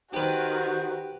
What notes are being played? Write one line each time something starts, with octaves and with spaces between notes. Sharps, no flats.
D#3 F#4 G4 B4 C5